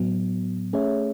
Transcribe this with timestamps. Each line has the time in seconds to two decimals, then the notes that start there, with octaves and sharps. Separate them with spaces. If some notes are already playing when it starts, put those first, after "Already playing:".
Already playing: A2 F#3 B3
0.73 A3 C#4 G#4 C#5 E5